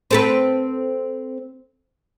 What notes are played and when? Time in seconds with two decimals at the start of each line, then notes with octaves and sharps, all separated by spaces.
0.11 C4 A4 B4